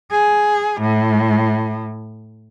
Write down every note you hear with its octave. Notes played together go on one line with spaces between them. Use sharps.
G#4
A2